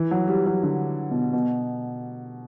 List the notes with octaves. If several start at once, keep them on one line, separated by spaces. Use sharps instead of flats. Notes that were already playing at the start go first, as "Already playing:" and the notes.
Already playing: E3
F#3
G3
F#3
D3
B2
B2